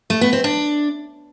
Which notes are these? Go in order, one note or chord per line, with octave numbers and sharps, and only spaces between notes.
A3
B3
C4
D4